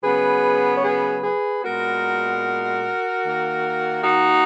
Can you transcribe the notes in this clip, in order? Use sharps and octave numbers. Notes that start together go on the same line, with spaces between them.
C#3 F#3 B3 G#4 B4
C#5
G#4 B4
G#4 B4
A#2 G#3 B3 F#4 A#4
D#3 A#3
D#4 F#4